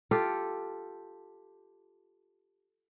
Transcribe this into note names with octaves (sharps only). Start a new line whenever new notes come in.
F4 G4 A4